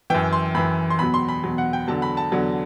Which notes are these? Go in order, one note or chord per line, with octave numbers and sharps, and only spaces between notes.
F#2 E3 G5
C6
F#2 E3 B5
C6
E2 B2 F#3 B5
C6
B5
E2 B2 F#3
F#5
G5
E2 D3 F#3 A5
B5
A5
E2 D3 F#3